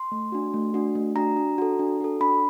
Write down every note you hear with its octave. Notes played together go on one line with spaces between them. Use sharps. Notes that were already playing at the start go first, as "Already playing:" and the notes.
Already playing: C6
A3
D4 F#4
A3
D4 F#4
A3
D4 F#4 A#5
D4
F#4 A4
D4
F#4 A4
D4 B5